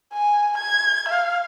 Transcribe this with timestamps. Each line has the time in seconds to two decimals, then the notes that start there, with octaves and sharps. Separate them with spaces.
0.13 G#5
0.58 G#6
1.09 F5